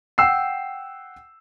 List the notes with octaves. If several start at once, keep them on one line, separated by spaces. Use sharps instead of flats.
F#5 G5 E6 C7